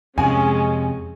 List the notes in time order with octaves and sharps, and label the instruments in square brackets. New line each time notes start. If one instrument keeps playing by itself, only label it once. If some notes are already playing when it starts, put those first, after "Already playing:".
[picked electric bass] F2 C3 [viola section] G#3 C#4 G#4 [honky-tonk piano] G#5